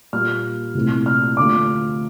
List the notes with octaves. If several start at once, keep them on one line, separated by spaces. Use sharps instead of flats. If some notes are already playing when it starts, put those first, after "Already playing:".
A#2 G3 A#3 F4 F6
C2 A#2 A3 C4 E4
F6
D2 D3 A3 D4 F4 D6